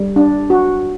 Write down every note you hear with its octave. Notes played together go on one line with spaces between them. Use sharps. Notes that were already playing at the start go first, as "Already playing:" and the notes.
Already playing: G3
D4
F#4